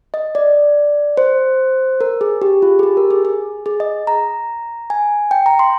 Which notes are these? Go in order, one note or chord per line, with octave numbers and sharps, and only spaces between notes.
D#5
D5
C5
A#4
G#4
G4
F4
G#4
G4
A#4
G#4
G#4
G#4
D#5
A#5
G#5
G5
A#5
C6